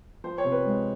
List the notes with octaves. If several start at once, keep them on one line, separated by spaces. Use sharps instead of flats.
F3 C5
C#5
C3
B4
G#3